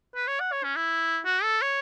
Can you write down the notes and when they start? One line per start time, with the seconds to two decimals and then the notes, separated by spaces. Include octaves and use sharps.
0.15 B4
0.27 C#5
0.40 F#5
0.52 C#5
0.64 C#4
0.76 E4
1.25 F#4
1.43 A4
1.62 C#5